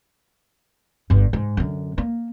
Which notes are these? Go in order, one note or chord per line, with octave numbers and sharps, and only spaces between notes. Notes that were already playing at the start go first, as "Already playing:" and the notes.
G1 G2
G#2
F#2 D3
A#3